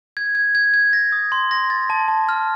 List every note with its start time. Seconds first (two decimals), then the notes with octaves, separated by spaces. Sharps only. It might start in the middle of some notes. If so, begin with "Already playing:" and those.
0.17 G#6
0.35 G#6
0.55 G#6
0.74 G#6
0.93 A#6
1.12 D#6
1.32 C6
1.51 A#6
1.70 A6
1.90 A5
2.08 A5
2.29 F6